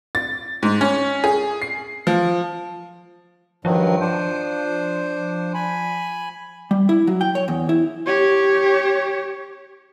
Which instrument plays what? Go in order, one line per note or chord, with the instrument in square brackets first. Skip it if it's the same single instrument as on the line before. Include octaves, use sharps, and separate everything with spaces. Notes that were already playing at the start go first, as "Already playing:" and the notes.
[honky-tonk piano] A6
G#2
C#4
G#4
C7
F3
[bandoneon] G2 D#3 F#3 [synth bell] F3
[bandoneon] D4 C5
G#5 B5
[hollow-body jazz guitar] G3
E4
F#3
G5
C#5
E2
E4
[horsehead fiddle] G4 C#5